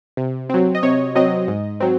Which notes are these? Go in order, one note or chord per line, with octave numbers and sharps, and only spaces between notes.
C3
F#3 C4
D#5
C3 C#5
F#3 C4 D#5
G#2
F#3 C4